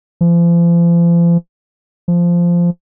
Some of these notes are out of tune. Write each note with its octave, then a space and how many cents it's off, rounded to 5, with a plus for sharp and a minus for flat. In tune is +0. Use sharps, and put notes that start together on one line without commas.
F3 -40
F3 -10